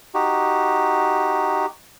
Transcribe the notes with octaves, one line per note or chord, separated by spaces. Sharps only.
D#4 F#4 G4